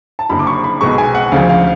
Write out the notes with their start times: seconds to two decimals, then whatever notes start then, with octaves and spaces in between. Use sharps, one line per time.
0.19 A5
0.30 F#1 F#2 D3 B5
0.39 D6
0.47 C#6
0.64 B5
0.81 B1 B2 G#3 C#6
0.98 G#5
1.15 F#5
1.32 D2 C#3 F3 F5
1.49 F5